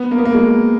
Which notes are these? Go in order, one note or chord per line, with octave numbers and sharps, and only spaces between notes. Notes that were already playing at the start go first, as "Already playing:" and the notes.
Already playing: B3
A#3
B3
A#3
G#3